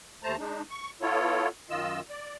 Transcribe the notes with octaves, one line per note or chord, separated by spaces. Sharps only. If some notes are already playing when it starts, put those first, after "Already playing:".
D#2 A3 C5 A5 A#5
G#3 D4 D#4
C#6
B3 E4 F4 A4 C#5
F#2 D#3 F4 D#5 E6
D5